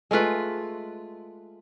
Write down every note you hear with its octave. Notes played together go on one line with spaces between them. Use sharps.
G#3 A3 F4 B4